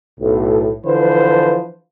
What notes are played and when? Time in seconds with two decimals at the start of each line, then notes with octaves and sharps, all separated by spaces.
0.19 B1 A2
0.84 D3 E3 F3 B4 C5